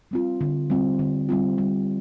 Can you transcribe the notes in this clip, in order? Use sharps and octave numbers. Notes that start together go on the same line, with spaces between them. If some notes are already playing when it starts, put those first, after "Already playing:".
G3 C4 F4
D3
G3 C4 F4
D3
G3 C4 F4
G3